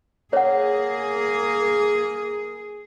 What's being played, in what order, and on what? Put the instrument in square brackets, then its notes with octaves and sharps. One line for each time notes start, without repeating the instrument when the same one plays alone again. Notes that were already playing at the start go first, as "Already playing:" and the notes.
[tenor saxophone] A#3 [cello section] G#4 [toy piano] C#5 F#5